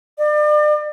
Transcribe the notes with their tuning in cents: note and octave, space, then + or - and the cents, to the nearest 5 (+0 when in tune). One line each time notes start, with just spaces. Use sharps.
D5 +35